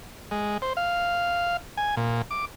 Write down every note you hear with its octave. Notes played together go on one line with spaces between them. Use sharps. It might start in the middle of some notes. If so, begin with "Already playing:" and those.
G#3
C5
F5
G#5
A#2
D6